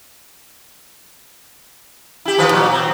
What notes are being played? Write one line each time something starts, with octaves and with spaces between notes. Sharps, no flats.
E4 G4
D#3 F3 B4
A#2 F#3
C4